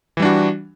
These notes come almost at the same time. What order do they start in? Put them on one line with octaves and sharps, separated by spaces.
E3 G3 D4 F#4